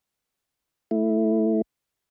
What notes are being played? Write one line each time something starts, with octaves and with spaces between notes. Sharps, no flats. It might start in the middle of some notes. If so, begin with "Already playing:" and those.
A3 E4